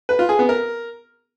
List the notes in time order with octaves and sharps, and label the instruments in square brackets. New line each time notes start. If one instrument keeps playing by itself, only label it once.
[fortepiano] B4
F4
G#4
B3
A#4